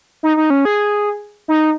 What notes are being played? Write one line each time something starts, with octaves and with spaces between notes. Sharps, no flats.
D#4
D#4
C#4
G#4
D#4